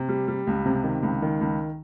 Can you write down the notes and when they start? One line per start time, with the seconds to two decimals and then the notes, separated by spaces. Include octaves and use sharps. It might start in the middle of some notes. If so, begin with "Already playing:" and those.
Already playing: C3
0.09 G3
0.28 G3
0.47 C#2
0.66 C3
0.84 D#3
1.03 C#2
1.22 D#3
1.41 C#2